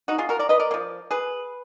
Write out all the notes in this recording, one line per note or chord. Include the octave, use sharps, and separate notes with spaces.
D#4 F#4
F4 G#4
F#4 A#4
A#4 D5
B4 D#5
A#4 D5
A#3
F3
G#4 B4